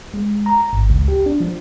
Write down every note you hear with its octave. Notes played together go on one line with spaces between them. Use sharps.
G#3
A#5
G#1
C#2
G4
D4
F3